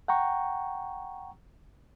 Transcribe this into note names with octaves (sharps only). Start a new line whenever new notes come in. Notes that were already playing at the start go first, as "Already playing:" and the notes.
F#5 G5 A#5 C#6